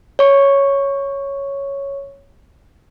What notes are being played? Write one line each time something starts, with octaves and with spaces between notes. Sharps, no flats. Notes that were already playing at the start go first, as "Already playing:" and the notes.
C#5 C#6